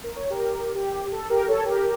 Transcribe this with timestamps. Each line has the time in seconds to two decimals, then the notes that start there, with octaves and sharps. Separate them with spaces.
0.04 A#4
0.16 C#5
0.30 G4 A#4
0.75 G4
1.12 A4
1.30 G4 A#4
1.48 A4 C#5
1.65 G4 A#4